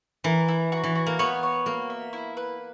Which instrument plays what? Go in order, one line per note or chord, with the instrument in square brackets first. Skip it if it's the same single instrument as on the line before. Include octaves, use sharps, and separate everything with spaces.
[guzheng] E3 [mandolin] A#4
[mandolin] E4
F#4
[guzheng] E3
[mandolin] F#4
[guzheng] A#3
[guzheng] B3 [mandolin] C#5
[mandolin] C#5
[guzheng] A#3 [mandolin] F#4
[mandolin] E5
E4
B4